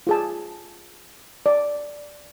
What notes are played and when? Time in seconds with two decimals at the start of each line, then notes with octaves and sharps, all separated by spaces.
0.07 F4 G#4 A5
1.46 D5